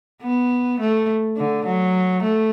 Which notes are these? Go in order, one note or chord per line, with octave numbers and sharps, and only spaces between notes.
B3
A3
D3
F#3
A3